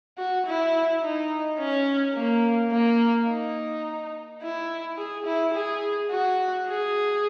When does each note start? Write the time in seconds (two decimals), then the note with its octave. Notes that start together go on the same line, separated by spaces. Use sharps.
0.18 F#4
0.46 E4
1.03 D#4
1.59 C#4
2.15 A#3
2.72 A#3
3.29 D#4
4.42 E4
4.98 G#4
5.26 E4
5.54 G#4
6.11 F#4
6.68 G#4